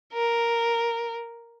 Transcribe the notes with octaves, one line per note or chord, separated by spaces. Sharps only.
A#4